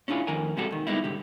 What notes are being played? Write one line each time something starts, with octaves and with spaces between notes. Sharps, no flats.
C#4 D4 E4 F4 G#4
F2 D#3 A#4 G#5
C3 G3 G#3 F#4 A4
D#2 D#3
G3 G#3 B3 D#4 E4
C2 G#2 D3 G4